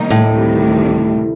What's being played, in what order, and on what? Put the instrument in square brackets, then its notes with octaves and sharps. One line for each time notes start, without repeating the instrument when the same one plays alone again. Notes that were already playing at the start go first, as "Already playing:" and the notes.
Already playing: [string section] C3 D#3 G3 A#3 D#4
[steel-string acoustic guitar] A2
[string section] D2 C3 D#3 G3